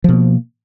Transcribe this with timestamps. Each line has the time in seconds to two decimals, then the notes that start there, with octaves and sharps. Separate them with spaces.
0.04 F3
0.09 B2
0.13 A#3